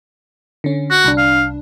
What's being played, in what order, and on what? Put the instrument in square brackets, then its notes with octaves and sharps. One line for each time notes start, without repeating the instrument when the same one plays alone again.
[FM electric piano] D3 C#4
[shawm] F#4
[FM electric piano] C2 D4
[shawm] F5